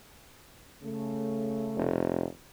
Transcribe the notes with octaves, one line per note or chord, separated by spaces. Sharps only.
C#3 A3
F1